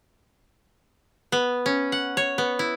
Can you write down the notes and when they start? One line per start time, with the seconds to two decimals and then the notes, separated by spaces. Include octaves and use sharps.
1.32 B3
1.66 C#4
1.92 F#5
2.17 C#5
2.38 B3
2.59 E4